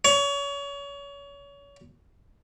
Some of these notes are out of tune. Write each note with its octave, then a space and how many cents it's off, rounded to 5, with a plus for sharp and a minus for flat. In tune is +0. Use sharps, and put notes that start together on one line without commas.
C#5 +30